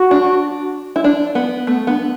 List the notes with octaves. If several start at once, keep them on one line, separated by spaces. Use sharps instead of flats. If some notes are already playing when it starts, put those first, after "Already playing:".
Already playing: F#4
D4
E4
D4
B3
A3 B3
B3 D4